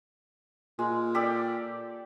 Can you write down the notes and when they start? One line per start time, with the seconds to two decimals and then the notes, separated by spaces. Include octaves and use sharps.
0.79 A#2 G#3
1.15 G4 A4 D5